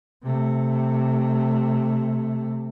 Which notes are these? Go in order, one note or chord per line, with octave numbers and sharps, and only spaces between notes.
C3 A3